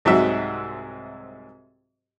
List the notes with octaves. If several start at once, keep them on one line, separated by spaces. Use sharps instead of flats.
C2 G#2 C3 F#3 F#4 E5